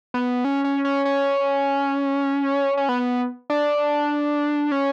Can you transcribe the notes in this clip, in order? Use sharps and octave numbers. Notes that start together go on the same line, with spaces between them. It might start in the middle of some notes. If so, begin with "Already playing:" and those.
B3
C#4
C#4
C#4
C#4
C#4
B3
D4
C#4